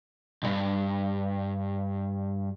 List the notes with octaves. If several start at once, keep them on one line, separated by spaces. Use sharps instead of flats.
B1 G2